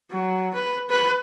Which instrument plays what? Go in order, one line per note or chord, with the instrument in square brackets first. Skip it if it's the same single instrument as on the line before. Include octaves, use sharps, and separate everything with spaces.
[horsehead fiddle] F#3
B4
B4